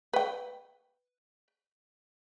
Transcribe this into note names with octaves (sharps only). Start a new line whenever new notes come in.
B4 G5